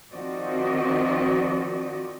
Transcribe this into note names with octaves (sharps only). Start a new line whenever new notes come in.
D#3 F3 C4 F#4 D5 D#5